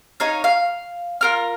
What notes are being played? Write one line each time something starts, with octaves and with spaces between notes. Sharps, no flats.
D#4 C#5 F5
F5
F4 A#4 F6